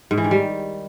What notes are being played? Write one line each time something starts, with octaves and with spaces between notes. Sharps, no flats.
G#2
E3
D#3
G3